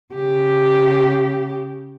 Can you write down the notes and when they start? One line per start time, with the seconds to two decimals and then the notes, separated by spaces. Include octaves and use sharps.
0.14 C#3 G4